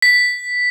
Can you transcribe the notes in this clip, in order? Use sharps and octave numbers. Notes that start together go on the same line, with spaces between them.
B6